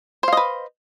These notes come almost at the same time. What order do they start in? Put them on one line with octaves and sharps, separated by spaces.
C5 F5 D#5 B4